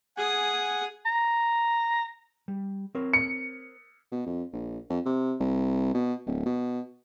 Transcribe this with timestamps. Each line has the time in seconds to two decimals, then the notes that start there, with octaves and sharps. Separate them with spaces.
0.17 G#4 F#5 G#5 D#6
1.06 A#5
2.48 G3
2.95 C4 A#4 C#5
3.13 C#7
4.12 B2
4.27 F2
4.53 A#1
4.90 F2
5.06 C3
5.40 C2
5.94 B2
6.26 D1
6.46 B2